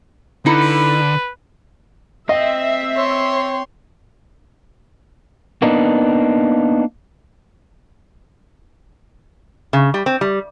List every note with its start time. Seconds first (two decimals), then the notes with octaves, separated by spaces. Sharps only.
0.46 D3 D#4 E4 A4 B4
2.29 C4 D#5 E5
2.97 C#5 C6
5.62 A#3 B3 D4 D#4
9.73 C#3
9.94 G3
10.06 C4
10.21 G3